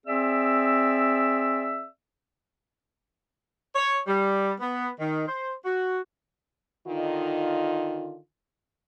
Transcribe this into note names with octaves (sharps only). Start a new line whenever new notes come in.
C4 G#4 D5 E5 E6
C#5
G3
B3
D#3
C5
F#4
D3 D#3 D#4 F4